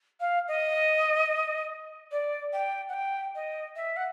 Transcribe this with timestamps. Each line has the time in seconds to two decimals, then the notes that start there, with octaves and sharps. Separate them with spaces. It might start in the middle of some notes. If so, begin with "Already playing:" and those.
0.20 F5
0.48 D#5
2.11 D5
2.53 G5
2.89 F#5
2.93 G5
3.35 D#5
3.76 E5
3.96 F#5